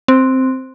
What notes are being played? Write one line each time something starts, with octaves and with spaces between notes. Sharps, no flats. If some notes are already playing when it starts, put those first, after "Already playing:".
C4